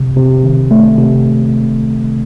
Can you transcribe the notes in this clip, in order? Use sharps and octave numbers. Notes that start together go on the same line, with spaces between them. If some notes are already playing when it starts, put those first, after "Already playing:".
Already playing: C3
C3
D#3
A3
C3